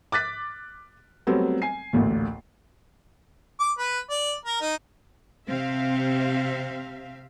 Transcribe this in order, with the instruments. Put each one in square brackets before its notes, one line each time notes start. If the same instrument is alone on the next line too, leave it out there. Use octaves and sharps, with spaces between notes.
[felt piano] D6 F#6 A6 B6
F#3 G3 A3 B3 C4
G#5 C7
A1 D2 A#2
[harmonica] D6
B4
D5
A#4
D#4
[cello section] C3 C4 E5 F5